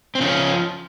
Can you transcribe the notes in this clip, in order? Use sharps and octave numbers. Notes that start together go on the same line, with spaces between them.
C4
C#3 F3 C#4